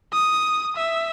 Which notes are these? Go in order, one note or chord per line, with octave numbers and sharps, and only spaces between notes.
D#6
E5